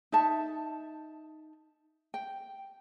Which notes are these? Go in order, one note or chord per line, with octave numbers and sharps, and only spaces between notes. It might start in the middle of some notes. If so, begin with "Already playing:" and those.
D#4 E5 A5
G5